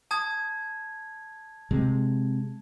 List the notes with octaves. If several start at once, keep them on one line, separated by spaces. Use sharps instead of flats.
A5 D#6 G#6
C3 G#3